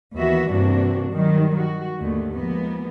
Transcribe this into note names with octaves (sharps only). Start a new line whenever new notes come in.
D#2 E3 B3 F#4 E5
G2 C3 E3 A#3 D4 F#4
D#3 F#3 G3
F#4
D#2 G#2 D3 A3
F3 G#3 A#3 B3